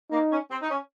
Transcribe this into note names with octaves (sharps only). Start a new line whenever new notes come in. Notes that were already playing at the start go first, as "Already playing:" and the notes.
A#3 D#4
C#4
C4
D#4
C#4